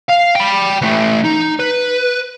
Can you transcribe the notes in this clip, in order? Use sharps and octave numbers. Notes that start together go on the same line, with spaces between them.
F5
G5 B5
E3 A3
D#4
B4